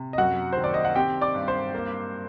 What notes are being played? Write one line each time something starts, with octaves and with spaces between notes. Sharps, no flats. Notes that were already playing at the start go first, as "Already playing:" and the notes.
Already playing: C3
D#5
F#2 F#4 F#5
D#3 C5
D5
D#5
F#5
C4 G4 G5
D5 D6
G2
C5 C6
A#3